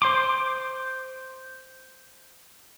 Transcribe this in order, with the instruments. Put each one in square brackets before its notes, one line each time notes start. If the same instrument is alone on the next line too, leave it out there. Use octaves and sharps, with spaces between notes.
[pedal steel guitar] C5 C6 D6